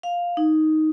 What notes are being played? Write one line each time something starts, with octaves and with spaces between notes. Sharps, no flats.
F5
D#4